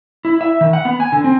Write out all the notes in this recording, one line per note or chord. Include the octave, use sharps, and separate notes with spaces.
E4
E5
D#3
F#5
B3
G#5
D3
C4